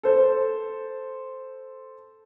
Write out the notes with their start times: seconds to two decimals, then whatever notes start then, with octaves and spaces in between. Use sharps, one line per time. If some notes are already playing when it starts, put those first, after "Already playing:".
0.03 A4 C5